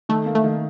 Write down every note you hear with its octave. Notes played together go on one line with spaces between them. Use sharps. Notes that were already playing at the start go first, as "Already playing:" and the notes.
D#3 A3
A#3
A3
D#3